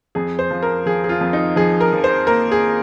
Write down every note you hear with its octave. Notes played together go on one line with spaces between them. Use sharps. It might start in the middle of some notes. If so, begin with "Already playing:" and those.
F2 G#4
C5
F3
A#4
F3 G#4
G#4
F4
F2
D#4
F3 G#4
A#4
F3
C5
A#3 A#4
G#4